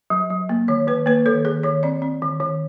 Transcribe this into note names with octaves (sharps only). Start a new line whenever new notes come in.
F#3
F#3
A#3
D#3 C#5
D#3 B4
A#3 B4
D#3 A4
D#3 G#4
D#3 C#5
C4 D5
C4
D#3
D#3